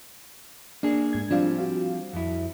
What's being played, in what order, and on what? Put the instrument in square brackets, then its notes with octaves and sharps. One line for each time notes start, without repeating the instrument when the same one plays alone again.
[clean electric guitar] A#3 G#4 [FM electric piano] D4
[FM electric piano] G#2 G#6
[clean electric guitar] F3 G3 C4 [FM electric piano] D4 F4 F5
[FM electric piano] F#4 F5
[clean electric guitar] F2 E4